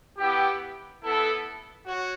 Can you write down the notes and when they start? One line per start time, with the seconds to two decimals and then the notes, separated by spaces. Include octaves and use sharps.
0.18 B3 E4 G4
1.01 B3 E4 A4
1.84 F#4 C#5